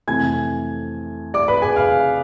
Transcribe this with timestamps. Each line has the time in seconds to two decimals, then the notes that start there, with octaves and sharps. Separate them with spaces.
0.07 F2 C3 E3 A3 G#5 G#6
1.34 D5 D6
1.48 B4 B5
1.62 G#4 G#5
1.76 F5 F6